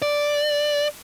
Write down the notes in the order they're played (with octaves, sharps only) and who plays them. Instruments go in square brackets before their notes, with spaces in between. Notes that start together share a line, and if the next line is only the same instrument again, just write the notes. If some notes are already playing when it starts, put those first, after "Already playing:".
[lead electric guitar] D5